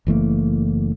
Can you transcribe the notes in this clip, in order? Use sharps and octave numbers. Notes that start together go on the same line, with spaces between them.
F#1 E3 A3 A#3